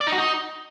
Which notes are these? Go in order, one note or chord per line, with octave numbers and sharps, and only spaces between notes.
D5
D#4
F#4
D#4